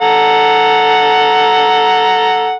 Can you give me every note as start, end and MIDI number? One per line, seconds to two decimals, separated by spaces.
0.01 2.57 69
0.01 2.57 78
0.01 2.57 82